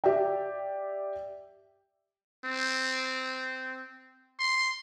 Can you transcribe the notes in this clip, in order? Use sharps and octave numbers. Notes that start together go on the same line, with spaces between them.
G4 D5 E5 G5
C4
C6